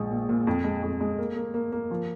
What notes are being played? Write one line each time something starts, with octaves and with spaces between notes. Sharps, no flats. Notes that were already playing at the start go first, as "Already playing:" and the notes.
Already playing: A#1 G#3
A#2
A#2
F2
G#3
F2
G#3
A#3
A#3
A#3
A#3
F3